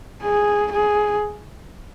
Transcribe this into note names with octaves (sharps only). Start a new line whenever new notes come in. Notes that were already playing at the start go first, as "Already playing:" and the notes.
G#4
G#4